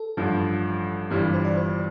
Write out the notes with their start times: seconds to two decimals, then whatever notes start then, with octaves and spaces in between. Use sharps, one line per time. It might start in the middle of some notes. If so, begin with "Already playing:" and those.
Already playing: A4
0.17 A1 G2 F3
1.10 G1 G2 E3 G3 G4
1.22 F4
1.34 C5
1.45 D5
1.57 C5